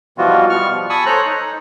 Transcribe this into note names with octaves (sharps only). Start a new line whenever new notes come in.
B2 E3 F3 G3 F4 F#4
B2 G3 B3 C#6 F6
F3
G#5 A5 B5 C#6 D#6 E6
A4 C5 C#5 A#5 F#6
D#4